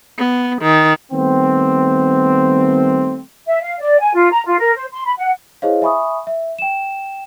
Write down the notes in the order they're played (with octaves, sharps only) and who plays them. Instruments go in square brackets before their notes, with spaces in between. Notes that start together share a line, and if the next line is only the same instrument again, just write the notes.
[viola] B3
D#3
[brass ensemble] D#3 G3 A3 B3 C4
[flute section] E5
F5
D5
G#5
F4
A#5
F4
A#4
C5
C6
B5
F#5
[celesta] E4 G#4 C5 C#5 D#5 F5
E5 G#5 B5 C#6 D#6
E5
G5 E7